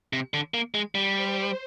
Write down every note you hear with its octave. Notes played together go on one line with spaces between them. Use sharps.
C3
D3
A#3
G#3
G3
C5